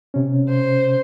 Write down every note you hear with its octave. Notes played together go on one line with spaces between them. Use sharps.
C3 C#4
C5